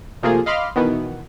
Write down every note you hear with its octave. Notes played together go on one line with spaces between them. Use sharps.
C3 F3 A3 A#3 F4 G#4
D#5 F5 B5 C6 D6 F6
B2 D#3 E3 B3